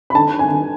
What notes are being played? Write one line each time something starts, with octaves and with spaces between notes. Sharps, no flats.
B5
D3 A5
G#5
D3